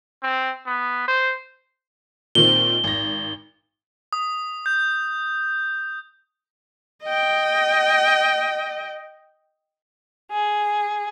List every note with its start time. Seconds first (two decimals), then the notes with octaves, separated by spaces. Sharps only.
0.23 C4
0.66 B3
1.08 C5
2.35 A#2 D#3 C4 G7
2.84 G#1 A#6
4.13 D#6
4.66 G6
7.03 D#5 G5
10.30 G#4